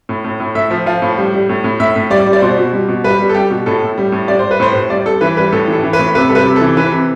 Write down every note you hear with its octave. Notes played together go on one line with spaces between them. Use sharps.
A2
A2
A2
A2 E5
F3
F3 F5
A2
G3
G3
A2
A2
A2 E5
A2
G3 D5
G3
D5
B2 C5
B2
G3
B2
G3 B4
G3
A4
G3 G4
B2
A2 A4
A2
G3
A2
G3 D5
G3 C5
B4
A2 C5
A2
G3 D5
G3 A4
E3 B4
G3 B4
A2 A4
E3 A4
E3
B4
A2
C3 B4
G3 A4
B4
C3
A4
E3
E3 B4
C3